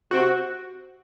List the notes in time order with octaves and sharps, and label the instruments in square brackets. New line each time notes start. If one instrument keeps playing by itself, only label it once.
[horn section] C3 C4 [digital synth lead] F#4